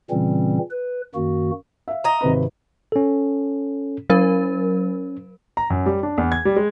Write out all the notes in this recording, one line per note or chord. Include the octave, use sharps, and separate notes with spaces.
A#2 C#3 E3 G3 C4 C#4
B4
F#2 D#3 A#3 F#4
E5 F5
D#5 A#5
G#1 C3 B4
C#4 A4
F#3 C#4 A#4
A#5
F#2
G3
D4
E2
G#6
G3
G#3